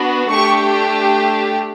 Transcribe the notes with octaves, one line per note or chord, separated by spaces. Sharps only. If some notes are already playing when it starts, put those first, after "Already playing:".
Already playing: B3 D4 F#4
A3 D4 G4 C#6